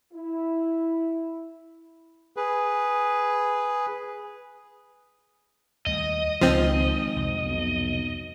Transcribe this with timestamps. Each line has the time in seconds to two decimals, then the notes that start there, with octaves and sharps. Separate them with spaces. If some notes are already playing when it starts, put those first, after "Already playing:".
0.13 E4
2.37 G#4 B4
5.86 D#2 G3 A3 D#5
6.41 G#1 C#2 F3 C4
7.16 C2 F2 C3
7.45 B1